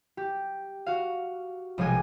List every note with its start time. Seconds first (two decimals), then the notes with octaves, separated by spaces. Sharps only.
0.17 G4
0.86 F#4 F5
1.78 B1 C3 F3 G#3 F4 G#5